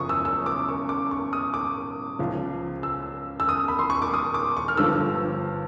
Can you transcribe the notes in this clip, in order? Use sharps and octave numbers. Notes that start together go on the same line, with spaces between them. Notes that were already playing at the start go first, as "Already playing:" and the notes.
Already playing: F#1 F#2 C#3 F3 C#6 D#6
E6
E6
D6
C#6
D6
C#6
D#6
D6
C#2 C#3 F3
E6
E6
D#6
B5
C6
C#6
D6
D#6
D6
C#6
F6
G1 G2 D3 F3 E6